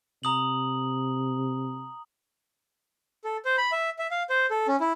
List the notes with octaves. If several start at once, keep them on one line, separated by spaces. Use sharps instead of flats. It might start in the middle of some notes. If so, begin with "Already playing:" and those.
C3 A#5 D#6 F#7
A4
C5
B5
E5
E5
F5
C5
A4
C#4
E4